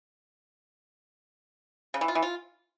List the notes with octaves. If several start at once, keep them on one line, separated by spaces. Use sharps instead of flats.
C#3
E3
F4
E3
F4